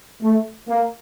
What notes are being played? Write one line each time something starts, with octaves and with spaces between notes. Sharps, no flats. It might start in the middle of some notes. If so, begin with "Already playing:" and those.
A3
A#3